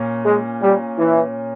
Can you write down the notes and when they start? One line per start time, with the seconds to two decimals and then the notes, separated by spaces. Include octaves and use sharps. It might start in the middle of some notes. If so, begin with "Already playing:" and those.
Already playing: A#2 C#4
0.25 G#3
0.62 G3
0.98 E3